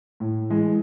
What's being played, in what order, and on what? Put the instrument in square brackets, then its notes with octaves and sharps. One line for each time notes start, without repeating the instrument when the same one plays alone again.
[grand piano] A2
E3 G#3